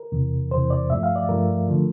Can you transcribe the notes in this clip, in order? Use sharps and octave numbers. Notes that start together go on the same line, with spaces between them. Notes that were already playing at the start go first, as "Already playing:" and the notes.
Already playing: A#4
E2 C3 E3
E2 C3 E3 C5
D5
G2 F3 A3 E5
F5
D5
G2 F3 A3 A#4
D3 F3 A3